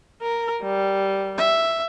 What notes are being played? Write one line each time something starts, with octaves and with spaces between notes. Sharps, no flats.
A#4
G3
E5